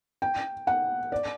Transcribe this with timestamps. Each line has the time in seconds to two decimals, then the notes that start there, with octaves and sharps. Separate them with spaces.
0.22 G5
0.67 F#5
1.12 D5